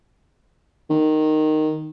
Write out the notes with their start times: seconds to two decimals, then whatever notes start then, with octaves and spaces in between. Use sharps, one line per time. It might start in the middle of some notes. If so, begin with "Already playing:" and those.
0.90 D#3